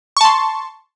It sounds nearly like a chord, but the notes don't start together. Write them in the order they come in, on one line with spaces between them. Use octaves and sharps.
C#6 A5 C6